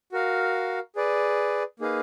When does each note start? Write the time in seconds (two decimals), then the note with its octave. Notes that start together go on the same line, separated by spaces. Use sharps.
0.12 F#4 A#4 F5
0.96 G#4 B4 D5
1.80 A#3 D#4 G#4 B4 F5